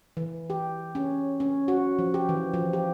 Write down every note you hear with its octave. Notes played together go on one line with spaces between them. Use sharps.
E3
G4
C#4
C#4
F#4
F3
G4
E3
F3
G4